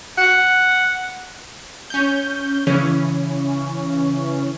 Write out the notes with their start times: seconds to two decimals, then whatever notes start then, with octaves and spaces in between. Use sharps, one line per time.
0.18 F#5
1.90 C#4 G6
2.67 C#3 E3 C#4